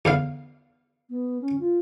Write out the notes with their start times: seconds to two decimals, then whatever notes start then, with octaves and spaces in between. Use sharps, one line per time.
0.05 E2 D3 F5
1.10 B3
1.41 C#4
1.60 F4